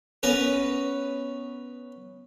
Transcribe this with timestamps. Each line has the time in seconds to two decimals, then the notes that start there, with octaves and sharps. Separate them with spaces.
0.23 B3 C#4 A#4 B4